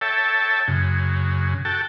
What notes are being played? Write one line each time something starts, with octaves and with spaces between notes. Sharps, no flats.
A4 C#5 E5 G5 A5
F#2 C#3
F#4 A4 G5 A5